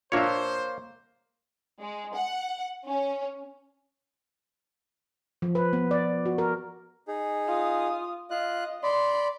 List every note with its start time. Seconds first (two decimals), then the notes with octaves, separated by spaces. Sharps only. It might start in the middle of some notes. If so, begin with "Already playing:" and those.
0.12 A#2 A#3 D4 C5 C#5 E5
1.80 G#3
2.15 F#5
2.86 C#4
5.42 F3
5.55 B4
5.73 B3
5.91 D5
6.26 F#4
6.38 A#4
7.08 D#4 G#4
7.47 F4 D#6
8.31 F4 D#5 F#6
8.83 D5 B5 C6